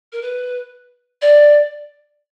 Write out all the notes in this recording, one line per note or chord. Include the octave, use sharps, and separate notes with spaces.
A#4
B4
D5